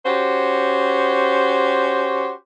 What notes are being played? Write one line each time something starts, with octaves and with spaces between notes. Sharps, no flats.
C#4 F#4 G4 C5